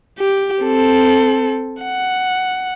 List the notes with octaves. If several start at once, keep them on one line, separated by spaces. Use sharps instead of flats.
G4
C4 A4
F#5